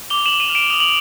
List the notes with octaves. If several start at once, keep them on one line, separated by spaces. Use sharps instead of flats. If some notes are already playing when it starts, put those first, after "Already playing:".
D6 F7 G7
D6 E7 F#7
D#7 F7
F6
D7 E7
D#6 F7
F#7